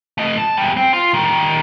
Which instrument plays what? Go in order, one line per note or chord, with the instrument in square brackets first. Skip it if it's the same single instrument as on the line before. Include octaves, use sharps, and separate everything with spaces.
[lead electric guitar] A3 D#5
A5
E2 G3
C4
F4
D#3 G3